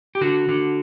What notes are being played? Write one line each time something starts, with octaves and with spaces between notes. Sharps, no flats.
G4
D3 F#4
D3